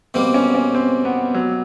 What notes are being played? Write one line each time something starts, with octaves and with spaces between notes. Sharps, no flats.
B2 G3 A#3 C4
C#4
C#4
C4
B3
F#3